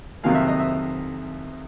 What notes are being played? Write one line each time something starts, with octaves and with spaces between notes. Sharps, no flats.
F2 C3 D#3 F#3 A#3 F5
E5
D#5
E5